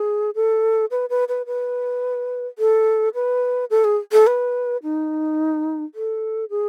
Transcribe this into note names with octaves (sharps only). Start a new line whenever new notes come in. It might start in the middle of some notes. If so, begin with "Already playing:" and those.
Already playing: G#4
A4
B4
B4
B4
B4
A4
B4
A4
G#4
A4
B4
D#4
A4
G#4